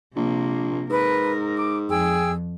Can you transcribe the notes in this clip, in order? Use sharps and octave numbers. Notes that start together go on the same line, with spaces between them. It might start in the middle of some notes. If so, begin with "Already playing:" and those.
A#1 C3 A#3
G#2 A#4 B4
D6
F2 G#4 G5 E6